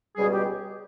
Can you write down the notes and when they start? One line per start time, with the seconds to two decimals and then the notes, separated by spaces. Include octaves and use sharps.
0.16 C#2 B2 G3 G#4
0.31 G4